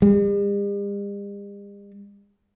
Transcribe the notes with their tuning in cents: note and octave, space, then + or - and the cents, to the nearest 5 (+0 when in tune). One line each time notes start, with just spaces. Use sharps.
G3 +45